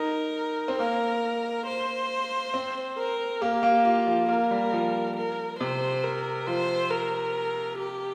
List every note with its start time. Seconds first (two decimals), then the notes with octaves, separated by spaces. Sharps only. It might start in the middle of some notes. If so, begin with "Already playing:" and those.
Already playing: D#4 A#4
0.68 C4
0.79 A#3 A#4
1.67 C5
2.54 C4
2.98 A#4
3.41 A#3 G4
3.63 A#3
3.85 F4
4.07 F3
4.29 A#3 A#4
4.51 G3
4.73 F3
5.17 A#4
5.60 C3 C5
6.04 A#4
6.47 F3 C5
6.91 A#4
7.79 G4